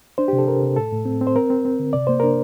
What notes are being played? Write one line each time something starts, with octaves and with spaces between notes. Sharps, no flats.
D4 C5
G4
C3
A4
C3 A#4
C3
A2 A4
A2
C4
C4
C5
C4 A#4
C4
C4
D3
C3 D5
A#3 C5
D4 A#4